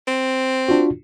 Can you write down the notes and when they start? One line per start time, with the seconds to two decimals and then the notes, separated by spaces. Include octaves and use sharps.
0.08 C4
0.68 D4 F4 F#4